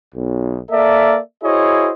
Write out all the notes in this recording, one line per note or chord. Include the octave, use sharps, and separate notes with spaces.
B1
A#3 A4 A#4 D5 E5
E4 F#4 G#4 C5 C#5 D#5